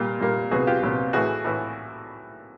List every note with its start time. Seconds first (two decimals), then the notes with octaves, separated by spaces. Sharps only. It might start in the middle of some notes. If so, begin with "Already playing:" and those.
Already playing: A#2 G3 A#3 F4
0.20 A#2 G3 A#3
0.51 C2 A#2 F#3 B3 F#4 G#4
0.67 F4 G4
0.82 C2 A#2 F#3 B3
1.13 A2 E3 A3 F#4 G#4
1.44 A2 E3